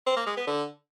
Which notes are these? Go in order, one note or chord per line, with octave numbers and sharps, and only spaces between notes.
C4
A#3
G#3
B3
D3